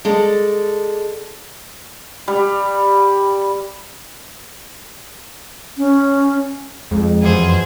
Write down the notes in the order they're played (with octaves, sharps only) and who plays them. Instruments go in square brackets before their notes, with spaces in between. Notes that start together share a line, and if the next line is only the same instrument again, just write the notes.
[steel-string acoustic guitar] G#3 A4 D5
[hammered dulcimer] G3
[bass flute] C#4
[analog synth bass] F2 [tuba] G#3
[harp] F#2 E3 C#7 [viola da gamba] G#4 C5